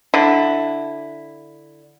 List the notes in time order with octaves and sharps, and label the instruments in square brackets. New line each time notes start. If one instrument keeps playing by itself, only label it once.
[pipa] D3 E4